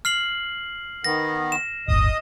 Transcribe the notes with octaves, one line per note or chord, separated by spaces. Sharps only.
F6 C7 F#7
D#3 B3 A#6
E7
D1 G1 D#5 D#6